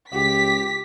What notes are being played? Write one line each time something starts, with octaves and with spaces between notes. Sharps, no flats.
C#2 G4 B6